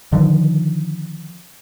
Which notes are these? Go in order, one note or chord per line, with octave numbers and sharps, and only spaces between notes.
D3 D#3 F3